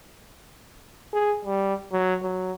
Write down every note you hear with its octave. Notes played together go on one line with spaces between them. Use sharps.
G#4
G3
F#3
F#3